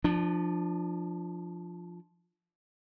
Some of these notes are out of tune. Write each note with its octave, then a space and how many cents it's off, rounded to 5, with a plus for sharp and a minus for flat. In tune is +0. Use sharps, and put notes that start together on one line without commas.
F3 +0 D4 +25